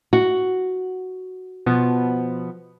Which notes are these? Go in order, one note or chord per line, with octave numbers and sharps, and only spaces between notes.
F#4
B2 F3 B3